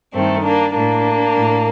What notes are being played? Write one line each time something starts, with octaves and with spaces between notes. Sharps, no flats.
G2 D#3 A3 C4
A#3 D4
A2 A#3 D4
A2